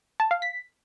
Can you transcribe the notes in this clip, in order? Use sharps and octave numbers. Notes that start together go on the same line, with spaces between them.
A5
F5
B6